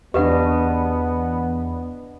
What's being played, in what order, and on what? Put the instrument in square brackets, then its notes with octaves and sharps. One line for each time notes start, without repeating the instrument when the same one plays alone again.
[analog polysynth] E2 [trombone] B3 [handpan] D4 D#5 [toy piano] G4 B4 F#5